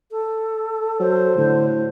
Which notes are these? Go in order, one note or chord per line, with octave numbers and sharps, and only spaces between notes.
A4
F#3 C5
A2 D3